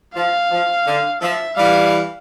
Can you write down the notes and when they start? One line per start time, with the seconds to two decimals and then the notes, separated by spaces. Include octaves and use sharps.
0.15 F3 F5
0.51 F3
0.87 D3
1.21 F3 E5
1.57 E3 G3 F5